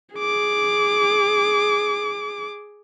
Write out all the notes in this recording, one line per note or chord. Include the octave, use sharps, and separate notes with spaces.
G#4 D6